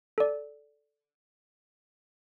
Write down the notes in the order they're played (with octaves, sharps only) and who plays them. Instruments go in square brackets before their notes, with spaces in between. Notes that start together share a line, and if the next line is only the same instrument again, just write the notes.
[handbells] A4 D5